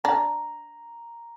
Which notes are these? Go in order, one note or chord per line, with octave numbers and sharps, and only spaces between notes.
D4 A#5